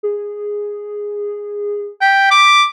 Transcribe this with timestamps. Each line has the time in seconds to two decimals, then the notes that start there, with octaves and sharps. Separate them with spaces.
0.03 G#4
2.01 G5 B6
2.31 D6